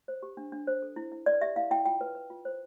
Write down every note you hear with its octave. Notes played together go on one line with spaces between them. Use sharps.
C5
G4
D4
D4
C5
A4
E4
E4
B4 D5
G4 E5
E4 F5
E4 G5
F4 G5
B4
B4
F4
C5